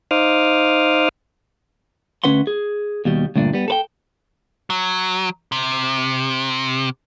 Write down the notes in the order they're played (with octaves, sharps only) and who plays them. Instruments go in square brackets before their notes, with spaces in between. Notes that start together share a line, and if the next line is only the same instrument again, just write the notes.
[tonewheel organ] D#4 C5 F5 D6 D#6 F6
[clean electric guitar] D2 C#4 B4 F#5 C6
G#4
D#2 B2 G3
D2 G2 A#2 D4
G3 B3
A4 B4 G5
[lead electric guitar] F#3
C3